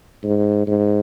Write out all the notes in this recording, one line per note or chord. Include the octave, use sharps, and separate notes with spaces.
G#2
G#2